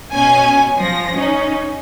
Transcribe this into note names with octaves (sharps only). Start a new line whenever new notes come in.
B2 C#4 G#5
F3 A#6
C#4 D#4